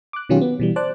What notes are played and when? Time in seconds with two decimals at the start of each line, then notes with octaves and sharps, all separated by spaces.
0.13 D6 F#6
0.29 B2 D#3 F#3 C#4 F4 G4
0.41 B3
0.60 B2 E3 G3
0.76 C5 D5 A5 D6 F#6